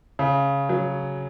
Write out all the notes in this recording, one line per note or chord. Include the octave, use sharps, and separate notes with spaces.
C#3
F#3